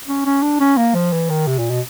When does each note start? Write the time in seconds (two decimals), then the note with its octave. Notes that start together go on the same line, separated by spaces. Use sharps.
0.08 C#4
0.26 C#4
0.43 D4
0.60 C#4
0.77 A#3
0.95 F3
1.13 E3
1.30 D#3
1.47 C3
1.59 A#2
1.70 B2